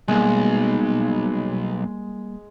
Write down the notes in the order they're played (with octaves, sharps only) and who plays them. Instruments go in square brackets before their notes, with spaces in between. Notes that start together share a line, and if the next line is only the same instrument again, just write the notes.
[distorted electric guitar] B1 [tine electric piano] G3 A#3 [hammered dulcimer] G#3